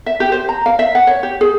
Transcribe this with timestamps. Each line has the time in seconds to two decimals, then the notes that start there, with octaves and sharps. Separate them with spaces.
0.06 E5
0.20 G4
0.32 C5
0.49 A#5
0.66 F5
0.79 E5
0.95 F#5
1.07 C#5
1.23 G4
1.41 G#4